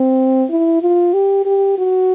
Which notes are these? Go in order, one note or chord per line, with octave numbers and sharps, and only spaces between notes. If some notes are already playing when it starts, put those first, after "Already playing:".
Already playing: C4
E4
F4
G4
G4
F#4